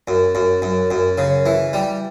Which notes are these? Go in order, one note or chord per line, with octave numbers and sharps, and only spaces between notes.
F#2
F#2
F#2
F#2
C#3
E3
G3